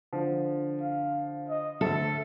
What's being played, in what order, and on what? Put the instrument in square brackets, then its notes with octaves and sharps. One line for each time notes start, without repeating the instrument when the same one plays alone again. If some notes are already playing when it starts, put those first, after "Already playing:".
[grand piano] D3 F3
[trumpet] F5
D#5
[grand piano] D2 [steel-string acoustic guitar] A4 [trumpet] E5